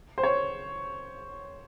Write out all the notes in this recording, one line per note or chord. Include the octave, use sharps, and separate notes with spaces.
C5
C#5